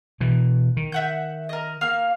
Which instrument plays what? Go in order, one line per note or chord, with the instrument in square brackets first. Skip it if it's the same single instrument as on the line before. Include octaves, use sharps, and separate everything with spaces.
[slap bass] B2 E3
D#3
[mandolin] E5 F#5 G6
A#4 D#5
A#3 F5 F6